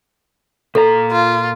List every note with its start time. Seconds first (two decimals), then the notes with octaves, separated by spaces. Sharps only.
0.75 A#2 A4 C5 A#5
1.12 F4